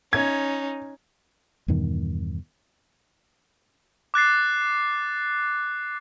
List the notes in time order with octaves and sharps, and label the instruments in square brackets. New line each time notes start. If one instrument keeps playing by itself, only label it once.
[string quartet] C#4 D#4 [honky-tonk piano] G#6
[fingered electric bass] E2 G2 B2 D#3
[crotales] D6 F#6 A6 C7